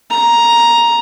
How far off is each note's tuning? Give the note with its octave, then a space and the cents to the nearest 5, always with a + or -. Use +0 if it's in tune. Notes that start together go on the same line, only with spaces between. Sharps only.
A#5 +5